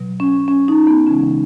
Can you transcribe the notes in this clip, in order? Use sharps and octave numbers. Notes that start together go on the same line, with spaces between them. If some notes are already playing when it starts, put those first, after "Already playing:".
Already playing: B2 F#3
C#4
C#4
D#4
B3
C#3 E3 G#3 C#4